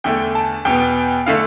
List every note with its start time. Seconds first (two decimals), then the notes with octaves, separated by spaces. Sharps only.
0.04 E2 D3 A3 G5
0.35 A5
0.65 E2 B2 B3 G5
1.26 D3 A3 F5